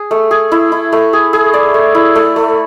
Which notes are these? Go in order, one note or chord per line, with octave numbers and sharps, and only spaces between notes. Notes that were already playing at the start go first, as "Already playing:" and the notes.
Already playing: G#4
A3
G#4
E4
E4
A3
G#4
G#4
D5
A3
E4
A3
A3